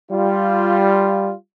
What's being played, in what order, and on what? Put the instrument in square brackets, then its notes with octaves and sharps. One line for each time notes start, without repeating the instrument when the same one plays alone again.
[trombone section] G3 F4